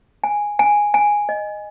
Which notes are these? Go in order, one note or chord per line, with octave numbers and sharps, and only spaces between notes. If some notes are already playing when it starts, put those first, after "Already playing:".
G#5
G#5
G#5
D#5